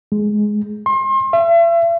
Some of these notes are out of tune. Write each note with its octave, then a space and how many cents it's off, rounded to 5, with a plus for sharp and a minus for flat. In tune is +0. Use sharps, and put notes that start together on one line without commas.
G#3 +10
C6 +35
E5 +40